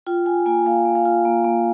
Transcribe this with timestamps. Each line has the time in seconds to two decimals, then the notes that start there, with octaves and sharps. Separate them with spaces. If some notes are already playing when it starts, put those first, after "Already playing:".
0.06 F4 G5
0.26 F4 G#5
0.46 A#3 G#5
0.65 A#3 F5
0.85 A#3
0.95 F5
1.05 F4
1.25 A#3
1.44 A#3